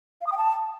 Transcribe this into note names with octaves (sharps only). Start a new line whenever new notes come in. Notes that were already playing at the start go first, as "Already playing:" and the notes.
F5
D#6
G5
A5